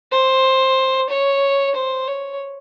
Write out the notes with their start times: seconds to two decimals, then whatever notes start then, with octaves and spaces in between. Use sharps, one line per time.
0.11 C5
1.09 C#5
1.75 C5
2.07 C#5